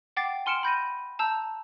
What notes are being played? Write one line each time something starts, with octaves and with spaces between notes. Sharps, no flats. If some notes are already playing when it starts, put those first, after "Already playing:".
F#5 G5 D6 A6 C7
G#5 C6 F6 C#7 D7 E7
B5 G6 A#6 D#7
A5 A#5 E6 G6